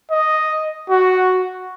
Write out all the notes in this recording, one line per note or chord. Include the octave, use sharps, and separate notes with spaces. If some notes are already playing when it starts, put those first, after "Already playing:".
D#5
F#4